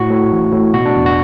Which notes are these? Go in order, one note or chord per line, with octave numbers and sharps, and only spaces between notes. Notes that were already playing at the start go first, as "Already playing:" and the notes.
Already playing: A2 F#4
A2
A1
A2
B2 F#4
D4
E2
F#4